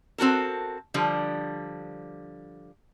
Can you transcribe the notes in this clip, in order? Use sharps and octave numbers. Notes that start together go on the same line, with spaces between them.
C4 F#4 A4 A#4
D3 F3 G3